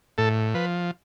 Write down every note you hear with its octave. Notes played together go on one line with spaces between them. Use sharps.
A2 A4
F3 B4